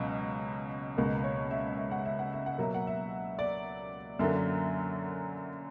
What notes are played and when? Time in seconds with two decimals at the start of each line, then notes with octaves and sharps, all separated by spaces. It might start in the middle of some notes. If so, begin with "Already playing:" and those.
Already playing: C#2 B2 F#3
0.97 C#2 B2 A#3
1.24 C#5
1.51 E5
1.77 E5
1.91 F#5
2.05 E5
2.19 F#5
2.33 E5
2.46 F#5
2.58 B2 F#3 A#3 E5
2.74 F#5
2.87 E5
3.39 D5
4.19 F#2 D3 F#3 A#3 E5